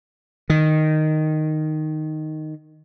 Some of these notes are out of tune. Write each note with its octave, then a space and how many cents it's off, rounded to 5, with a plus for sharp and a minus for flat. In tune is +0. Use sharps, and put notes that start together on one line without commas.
D#3 -5